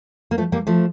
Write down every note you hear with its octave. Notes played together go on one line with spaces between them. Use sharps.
A#3
F3 A3
G3 A#3
F3 A3